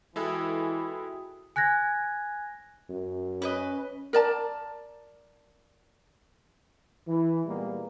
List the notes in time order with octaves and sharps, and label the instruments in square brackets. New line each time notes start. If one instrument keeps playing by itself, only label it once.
[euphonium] E3 [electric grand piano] G#3 E4 A4 [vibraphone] F#4 G5 D#6
[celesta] G#5 F#6 G#6 A#6
[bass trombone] F#2
[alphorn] C#4 [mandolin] B4 C5 D#5
[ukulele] A#4 D5 A5
[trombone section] E3
A#2 E3 G3 G#3 A#3 B3